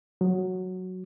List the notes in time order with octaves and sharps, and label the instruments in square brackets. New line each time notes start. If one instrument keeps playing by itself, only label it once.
[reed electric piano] F#3